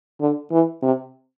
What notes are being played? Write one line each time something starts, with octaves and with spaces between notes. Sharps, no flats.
D3
E3
C3